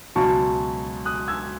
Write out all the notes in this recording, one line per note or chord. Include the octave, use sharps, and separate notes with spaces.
C#2 B2 F#3 A5 C#6
D#6 F#6
E6 G#6